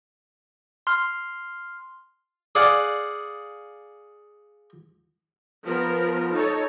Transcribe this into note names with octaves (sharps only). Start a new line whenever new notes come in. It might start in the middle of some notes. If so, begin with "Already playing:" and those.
C6 F6
G#4 D5 F5 F#5
F3 B3 A#4
D#4 A4 C#5